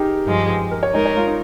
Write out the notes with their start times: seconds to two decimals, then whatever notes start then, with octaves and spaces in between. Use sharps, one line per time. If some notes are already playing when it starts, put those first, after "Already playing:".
Already playing: D#4 G4 G#4 A#4
0.26 G2 F3 G#3
0.71 A#4
0.83 C#5
0.94 G#3 D#4 A#4 C#5
1.06 C#5
1.17 F4
1.27 D#4